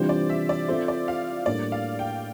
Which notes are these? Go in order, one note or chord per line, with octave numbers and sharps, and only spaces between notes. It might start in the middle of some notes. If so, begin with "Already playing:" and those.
Already playing: C3 E3 G3 D4 F4 C5
D5
E5
D5
C4 F4 A4 C5 E5
D5
F5
A2 G3 A#3 D4 D5
F5
G5